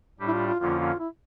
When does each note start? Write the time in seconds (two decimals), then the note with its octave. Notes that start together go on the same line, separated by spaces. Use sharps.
0.20 A2 G3 D4 G4
0.28 E4
0.33 F4
0.46 F4
0.59 F2 D3 F3 A#3 C#4 F4
0.80 F4
1.00 E4